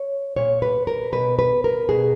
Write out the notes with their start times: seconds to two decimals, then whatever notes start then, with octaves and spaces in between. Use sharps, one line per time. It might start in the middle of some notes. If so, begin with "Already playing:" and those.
Already playing: C#5
0.36 A#2 C#5
0.62 B4
0.87 A#4
1.12 B2 B4
1.39 B4
1.64 A#4
1.89 B2 G#4